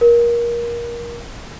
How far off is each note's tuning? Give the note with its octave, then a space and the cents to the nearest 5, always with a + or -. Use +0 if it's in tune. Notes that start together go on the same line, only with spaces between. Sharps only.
A#4 +20